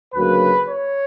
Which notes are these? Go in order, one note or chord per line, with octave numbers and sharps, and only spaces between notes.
D2 C#3 F#3 A#3 B4
C#5